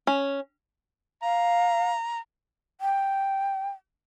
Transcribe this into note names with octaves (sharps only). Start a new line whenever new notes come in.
C#4
F5 A#5
G5